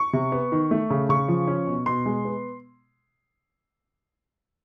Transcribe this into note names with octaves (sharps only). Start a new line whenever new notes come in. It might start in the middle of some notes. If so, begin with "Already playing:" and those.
Already playing: C#6
C3
B3
D#3
A3
C#3
C#3 C#6
F3
C#4
B2
B2 C6
G#3
B3